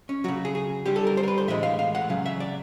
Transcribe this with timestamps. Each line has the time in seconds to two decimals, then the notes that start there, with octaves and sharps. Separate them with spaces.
0.09 C#4
0.24 C#3 F#3 F#4
0.45 G#4
0.55 G#4
0.86 D3 G3 G4
0.96 A4
1.07 A#4
1.17 C5
1.23 A#4
1.28 B4
1.38 C5
1.48 A2 E3 G#3 E5
1.63 F5
1.79 F5
1.95 F#5
2.10 C#3 F#3 F5
2.26 E5
2.40 D5